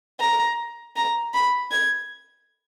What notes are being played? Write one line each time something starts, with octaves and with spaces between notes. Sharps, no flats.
A#5
A#5
B5
G#6